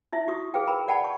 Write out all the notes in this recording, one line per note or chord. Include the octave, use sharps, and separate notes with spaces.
D#4 E4 E5
F#4 C#6 D#6
G#4 B4 F5 G5
A#4 G5 B5
D5 F#5 G5 A5 B5
C#6